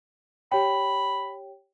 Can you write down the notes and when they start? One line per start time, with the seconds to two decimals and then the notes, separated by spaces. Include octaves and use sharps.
0.52 G4 C#5 G5 B5